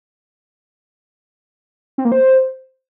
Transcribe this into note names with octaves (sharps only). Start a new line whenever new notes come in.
C4
A#3
C5